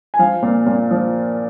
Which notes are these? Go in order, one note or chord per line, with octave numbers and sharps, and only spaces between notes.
G#5
F3 F5
A#2
A#2
F3